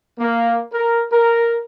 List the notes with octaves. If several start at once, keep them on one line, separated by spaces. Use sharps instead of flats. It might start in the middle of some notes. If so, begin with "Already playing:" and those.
A#3
A#4
A#4